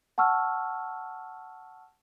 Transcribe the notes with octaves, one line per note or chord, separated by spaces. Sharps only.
F#5 A5 C#6 E6 F6